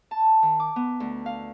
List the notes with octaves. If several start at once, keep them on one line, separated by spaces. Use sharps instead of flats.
A5
D#3
D6
B3
D2
F5